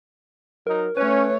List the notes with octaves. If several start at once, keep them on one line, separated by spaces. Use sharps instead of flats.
F#3 D#4 A#4
A3 C#4 B4 C#5